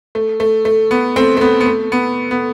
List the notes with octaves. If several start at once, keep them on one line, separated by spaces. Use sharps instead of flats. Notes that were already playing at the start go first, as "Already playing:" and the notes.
A3
A3
A3
B3
A3 C4
A3
B3
B3
A3
B3
B3